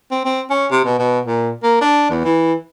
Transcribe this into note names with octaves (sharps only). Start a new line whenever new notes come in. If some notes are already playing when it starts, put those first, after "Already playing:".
C4
C4
C#4
C3
B2
B2
A#2
A#3
D4
E2
E3